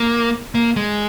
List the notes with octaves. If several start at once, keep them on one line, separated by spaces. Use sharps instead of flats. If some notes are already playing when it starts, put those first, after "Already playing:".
Already playing: A#3
A#3
G#3